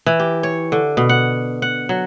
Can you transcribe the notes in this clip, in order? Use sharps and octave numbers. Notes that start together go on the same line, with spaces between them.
E3
G4
C#5
D3
B2
F#5
F#5
F#3